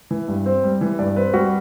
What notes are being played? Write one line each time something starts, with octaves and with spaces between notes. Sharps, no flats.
E3
G2
C4
G3
E3
G2 D5
C4 B4
G3 F#4